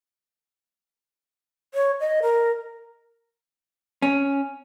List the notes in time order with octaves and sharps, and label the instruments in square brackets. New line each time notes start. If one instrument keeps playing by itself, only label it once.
[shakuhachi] C#5
D#5
A#4
[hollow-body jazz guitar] C#4